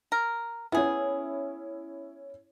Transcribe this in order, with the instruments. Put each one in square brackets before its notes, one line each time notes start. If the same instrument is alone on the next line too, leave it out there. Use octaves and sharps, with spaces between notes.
[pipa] A#4
[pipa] B3 G#4 [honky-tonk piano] C#4 E4